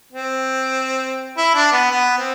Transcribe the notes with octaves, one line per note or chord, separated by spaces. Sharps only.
C4
E4
D4
B3
B3
C4